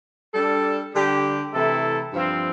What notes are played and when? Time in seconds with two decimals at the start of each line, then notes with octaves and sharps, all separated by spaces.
0.34 G3 D4 A4
0.94 D3 G3 D4 G4
1.53 C3 E3 A3 E4 A4
2.13 G2 F3 C4